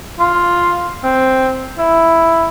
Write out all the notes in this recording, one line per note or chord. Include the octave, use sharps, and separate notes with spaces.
F4
C4
E4